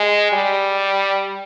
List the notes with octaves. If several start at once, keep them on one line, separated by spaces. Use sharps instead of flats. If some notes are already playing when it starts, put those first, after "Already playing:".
Already playing: G#3
G3